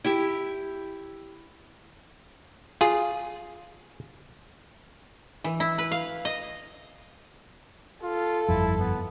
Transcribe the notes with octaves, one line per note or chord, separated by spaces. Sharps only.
E4 G4 E5
F4 G#4
E3
E4
B4
F5
D#5
F4 A4
G1 F2 E4
B3